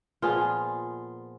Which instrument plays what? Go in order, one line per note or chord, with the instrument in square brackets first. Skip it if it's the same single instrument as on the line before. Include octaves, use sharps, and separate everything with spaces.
[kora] A#2 F3 B3 F4 G#4